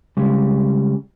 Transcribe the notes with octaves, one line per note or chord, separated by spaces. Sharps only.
C#3 G3 G#3